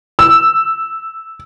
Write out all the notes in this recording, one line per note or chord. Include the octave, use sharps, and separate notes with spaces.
E6